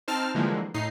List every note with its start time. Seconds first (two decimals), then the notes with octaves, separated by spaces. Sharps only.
0.08 C4 D#4 A5 F6
0.35 D3 E3 F3 G3 G#3 A#3
0.74 A2 D#4 C7